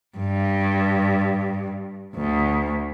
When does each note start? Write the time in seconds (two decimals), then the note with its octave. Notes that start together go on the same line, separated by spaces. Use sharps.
0.18 G2
2.15 D2